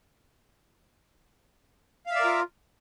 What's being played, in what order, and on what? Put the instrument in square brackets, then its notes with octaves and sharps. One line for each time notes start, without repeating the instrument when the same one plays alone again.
[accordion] F5
E5
D5
A#4
F4